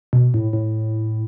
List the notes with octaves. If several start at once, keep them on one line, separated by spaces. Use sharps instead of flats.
B2
A2
A2